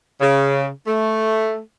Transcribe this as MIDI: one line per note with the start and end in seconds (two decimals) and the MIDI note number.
0.20 0.67 49
0.86 1.58 57